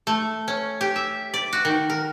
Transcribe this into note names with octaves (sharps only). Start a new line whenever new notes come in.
A3
C#4
G4
E5
D5
F#4
D#3
A#4